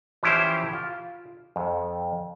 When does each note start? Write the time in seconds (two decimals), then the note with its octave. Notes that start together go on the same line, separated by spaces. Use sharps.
0.23 E3 F3 C#4 E4 G4 C5
0.73 F4
1.56 F2